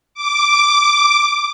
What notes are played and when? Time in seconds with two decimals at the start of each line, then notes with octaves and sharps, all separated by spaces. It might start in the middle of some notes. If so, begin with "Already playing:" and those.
0.14 D6